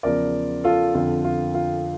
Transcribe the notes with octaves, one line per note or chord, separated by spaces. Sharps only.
E2 C#3 F3 A#4 D5
F4 A4
F2 D3 F3 F4
F4
F4